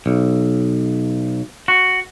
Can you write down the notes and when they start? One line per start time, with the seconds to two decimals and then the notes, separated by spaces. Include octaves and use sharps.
0.06 B1
1.68 F#4